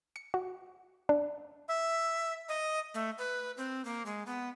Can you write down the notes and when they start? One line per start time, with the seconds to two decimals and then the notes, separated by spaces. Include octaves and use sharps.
0.16 C#7
0.34 F#4
1.09 D4
1.68 E5
2.49 D#5
2.94 A3
3.18 B4
3.57 C4
3.85 A#3
4.06 G#3
4.26 B3